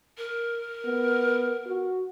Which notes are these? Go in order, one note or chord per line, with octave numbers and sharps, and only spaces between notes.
A#4
B3
F#4